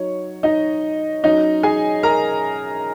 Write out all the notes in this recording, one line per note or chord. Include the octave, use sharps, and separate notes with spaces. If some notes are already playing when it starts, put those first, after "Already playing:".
Already playing: F#3 D#4 C#5
D#4 D#5
F#3 C#4 D#4 D#5
G#4 G#5
A#4 A#5